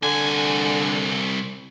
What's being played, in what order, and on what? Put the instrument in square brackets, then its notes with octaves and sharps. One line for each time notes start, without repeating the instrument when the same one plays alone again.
[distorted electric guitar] C2 G#5 [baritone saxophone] D3